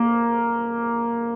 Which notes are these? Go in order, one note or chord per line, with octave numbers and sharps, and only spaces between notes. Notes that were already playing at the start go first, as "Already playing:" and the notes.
Already playing: A#3